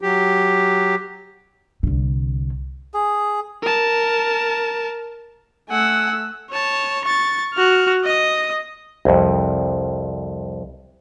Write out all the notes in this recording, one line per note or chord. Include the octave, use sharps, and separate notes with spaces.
F#3 G4
C2 D3
G#4
A#4 A5
A3 F#5 G#5 E6
C#5 A5
C#6 A6
F#4 F6
D#5 D#6
C2 F2